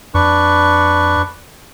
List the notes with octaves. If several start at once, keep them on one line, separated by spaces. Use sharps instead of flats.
F2 D4 B4 C#6